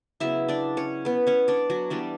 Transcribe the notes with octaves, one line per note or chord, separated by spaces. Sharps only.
C#3 F#3 B3 E4 E5
D4 D5
C#4 C#5
B3 B4
C#4 C#5
D4 D5
F#3 F#4
E3 G3 B3 D4